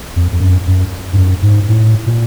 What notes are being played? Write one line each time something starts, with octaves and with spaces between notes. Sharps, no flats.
F2
F2
F#2
F#2
G2
F#2
G#2
A2
A#2